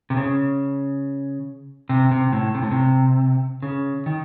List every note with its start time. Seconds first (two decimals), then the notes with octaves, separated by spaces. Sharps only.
0.10 C3
0.17 C#3
1.89 C3
2.11 C3
2.32 A2
2.55 C3
2.62 A2
2.71 C3
3.62 C#3
4.06 D#3